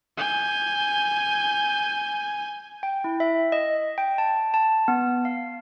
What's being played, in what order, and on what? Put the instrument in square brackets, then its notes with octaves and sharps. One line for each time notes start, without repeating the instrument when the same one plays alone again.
[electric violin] G#5 G6
[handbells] G5
E4
E5
D#5
G5
A5
A5
B3
F5